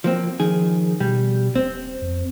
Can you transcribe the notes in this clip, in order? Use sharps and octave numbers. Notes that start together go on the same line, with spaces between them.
F3 A#3 C4
D#3 F3 G#4
B2 G3
D#1 C4
F2